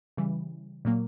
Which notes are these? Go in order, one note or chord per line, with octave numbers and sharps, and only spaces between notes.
C#3 E3 G3
A#2 F#3 A#3